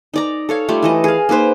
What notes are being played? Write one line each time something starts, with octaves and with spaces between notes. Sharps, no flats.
D#4 D5 A#5
A4 C#5 F5
G3 A3 F4 G4
E3 A4 D#5
G#4 F5
A#3 D#4 B4 C5